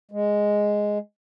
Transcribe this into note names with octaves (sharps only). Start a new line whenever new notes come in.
G#3